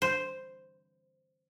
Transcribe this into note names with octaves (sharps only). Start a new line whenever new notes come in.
C5